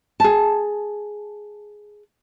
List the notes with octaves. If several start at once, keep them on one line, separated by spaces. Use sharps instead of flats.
G#4 A5